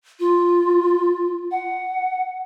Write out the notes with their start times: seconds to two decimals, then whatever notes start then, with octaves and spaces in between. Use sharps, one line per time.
0.20 F4
1.51 F#5